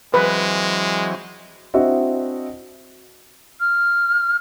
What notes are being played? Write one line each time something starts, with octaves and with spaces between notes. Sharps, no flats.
E3 F#3 G#3 C4 B4
C4 D4 E4 F#4 D#5 E5
F6